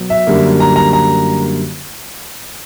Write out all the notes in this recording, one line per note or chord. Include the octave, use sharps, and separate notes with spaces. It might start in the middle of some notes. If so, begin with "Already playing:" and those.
Already playing: B2 F#3
E5
F#2 D3 G3 A#3
A#5
A#5
A#5